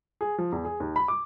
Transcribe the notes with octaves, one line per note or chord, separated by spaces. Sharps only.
G#4
F3
E2
G#4
D#2
B5
D6